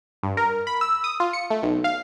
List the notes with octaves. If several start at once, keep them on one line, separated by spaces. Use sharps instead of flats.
G2
A#4
B5
E6
D#6
F4
C#7
A3
B1
F5